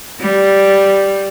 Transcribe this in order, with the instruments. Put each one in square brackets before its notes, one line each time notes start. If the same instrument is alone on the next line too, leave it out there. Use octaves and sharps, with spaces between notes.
[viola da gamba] G3